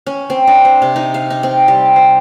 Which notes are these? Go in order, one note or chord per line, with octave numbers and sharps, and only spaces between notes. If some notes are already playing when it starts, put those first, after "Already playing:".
C#4
C4
D4
C5
C3
D#4
F5
D#4
C4
G3
C5